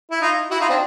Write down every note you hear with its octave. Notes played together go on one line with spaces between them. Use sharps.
E4
D#4 F4
E4 F#4
D#4 F4
C4 D4